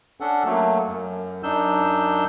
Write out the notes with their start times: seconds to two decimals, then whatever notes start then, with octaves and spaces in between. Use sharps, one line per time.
0.21 C#4 D4 A4 F#5
0.45 F#3 A3 A#3
0.87 F#2
1.43 F#2 D4 D#4 E6 G6